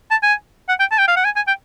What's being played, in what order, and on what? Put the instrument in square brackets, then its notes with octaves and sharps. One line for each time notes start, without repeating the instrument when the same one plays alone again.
[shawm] A5
G#5
F#5
G5
A5
G5
F5
F#5
G#5
G#5
G5